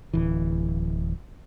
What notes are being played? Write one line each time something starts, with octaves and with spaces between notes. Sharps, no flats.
D1 E3